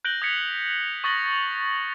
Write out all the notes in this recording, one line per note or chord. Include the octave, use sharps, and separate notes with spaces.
F#6 G6 A#6 D7 F#7 G7
D#6 G#6 B6 C#7 F7
C#6 D#6 A6 A#6 F#7 G7